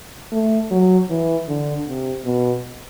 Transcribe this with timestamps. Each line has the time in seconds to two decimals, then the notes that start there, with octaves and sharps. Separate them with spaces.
0.32 A3
0.71 F#3
1.10 E3
1.48 D3
1.87 C3
2.25 B2